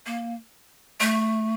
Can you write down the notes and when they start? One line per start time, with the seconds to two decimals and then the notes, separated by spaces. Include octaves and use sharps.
0.06 A#3
1.00 A3